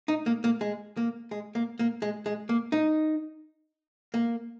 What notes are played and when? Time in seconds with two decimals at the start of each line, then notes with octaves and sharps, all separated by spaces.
0.08 D#4
0.26 A#3
0.44 A#3
0.61 G#3
0.97 A#3
1.31 G#3
1.55 A#3
1.79 A#3
2.02 G#3
2.26 G#3
2.49 A#3
2.72 D#4
4.14 A#3